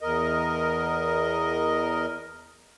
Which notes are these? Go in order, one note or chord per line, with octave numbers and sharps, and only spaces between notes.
E2 A#4 D#5